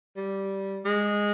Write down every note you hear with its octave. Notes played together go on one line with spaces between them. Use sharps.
G3
G#3